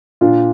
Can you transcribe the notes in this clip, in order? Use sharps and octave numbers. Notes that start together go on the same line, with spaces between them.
A#2 D4 F4